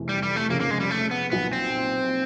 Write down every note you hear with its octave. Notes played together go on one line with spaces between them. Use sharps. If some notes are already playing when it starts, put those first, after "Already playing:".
Already playing: F1 E2 C3 E3 A3
G3
G3
A3
F1 F2 C#3 A#3
A#3
G#3
G3
A3
B3
B1 A#2 F3 B3
C4